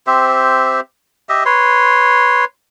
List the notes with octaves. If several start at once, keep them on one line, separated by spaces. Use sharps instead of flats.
C4 G4 C5 E5
G4 D#5 E5
B4 C#5 C6